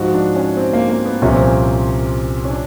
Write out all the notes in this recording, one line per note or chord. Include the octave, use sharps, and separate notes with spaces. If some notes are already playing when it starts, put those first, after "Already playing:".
Already playing: G#2 F3 F#4
D4
C#4
C4
A#3
A#3
B3
C2 A#2 F3 C#4
C4
C#4
C#4
D4